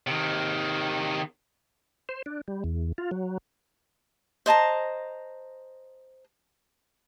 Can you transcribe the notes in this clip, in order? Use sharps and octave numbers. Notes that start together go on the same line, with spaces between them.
C3 D#3
C5
D4
G3
E2
F4
F#3
C5 D#5 A5 A#5